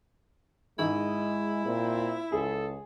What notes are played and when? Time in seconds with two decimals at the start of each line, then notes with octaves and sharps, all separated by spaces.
0.79 G#2 D#3 G#3 E4 D#5
1.65 A#2 C4
2.32 C#2 G#4 A4